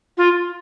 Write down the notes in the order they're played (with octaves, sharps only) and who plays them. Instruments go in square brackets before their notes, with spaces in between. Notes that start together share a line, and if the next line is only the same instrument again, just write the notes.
[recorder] F4